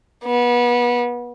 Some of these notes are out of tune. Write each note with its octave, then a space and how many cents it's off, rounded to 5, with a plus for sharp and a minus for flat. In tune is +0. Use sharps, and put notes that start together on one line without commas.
B3 -30